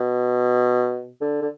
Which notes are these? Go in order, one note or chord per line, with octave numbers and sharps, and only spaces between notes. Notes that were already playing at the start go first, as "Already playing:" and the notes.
Already playing: B2
D3
D3